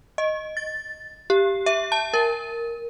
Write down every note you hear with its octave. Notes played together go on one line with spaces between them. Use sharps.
D#5
A6
G4
E5
A5
A#4